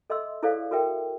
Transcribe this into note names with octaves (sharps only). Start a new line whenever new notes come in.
A4 D#5 E5 C6 E6
E4 G#4 A4 C5 D5 F5
F#4 A4 A#4 E5 G5